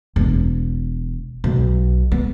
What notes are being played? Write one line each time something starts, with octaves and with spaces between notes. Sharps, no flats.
E1
B1
B3